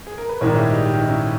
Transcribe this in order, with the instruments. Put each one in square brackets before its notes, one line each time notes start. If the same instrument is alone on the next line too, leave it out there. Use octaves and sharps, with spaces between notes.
[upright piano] G#4
A#4
B4
[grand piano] A#1 G#2 D#3 G3 [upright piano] A#4 C#5
[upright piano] E4 G#4
D#4 G4
G4
E4
D#4
C#4 E4